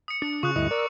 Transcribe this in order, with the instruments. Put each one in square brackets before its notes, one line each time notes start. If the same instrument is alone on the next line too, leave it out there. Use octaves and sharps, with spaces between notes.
[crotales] D#6 C#7
[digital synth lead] D4
[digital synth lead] C#3 [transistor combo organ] F4 [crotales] C#6 D#6 F#6
[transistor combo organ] D2 E4 D#5 [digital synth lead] G2 [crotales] D#6
[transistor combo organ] A#4 D5 [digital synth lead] E6